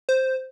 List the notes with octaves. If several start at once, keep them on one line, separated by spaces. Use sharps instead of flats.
C5